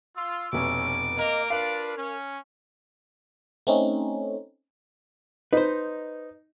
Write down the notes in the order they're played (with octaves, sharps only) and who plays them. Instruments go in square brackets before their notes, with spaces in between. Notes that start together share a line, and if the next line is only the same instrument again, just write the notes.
[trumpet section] F4 [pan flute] E6
[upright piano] F1 B2 [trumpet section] C#4 [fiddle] D6
[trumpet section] A#3 A#4 [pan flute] D#5
[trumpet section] D4 F4 B4 [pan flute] A#4 [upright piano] F5
[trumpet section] C#4
[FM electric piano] A3 C4 C#4 D#4
[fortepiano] D#4 [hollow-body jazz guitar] B4 C5